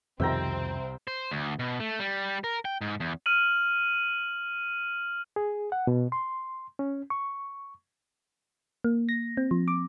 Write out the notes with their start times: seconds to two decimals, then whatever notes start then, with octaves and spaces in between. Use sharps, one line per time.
0.20 C2 F2 B2 D#3 C4 E5 G5 A#5
1.08 C5
1.31 D2
1.59 B2
1.80 A3
1.99 G3
2.44 A#4
2.65 G5
2.81 G#2
3.00 E2
3.26 F6 D#7 F#7
5.36 G#4
5.72 F#5
5.87 B2
6.12 C6
6.79 C#4
7.10 C#6
8.84 A#3
9.09 A#6
9.37 C4
9.51 F3
9.68 D6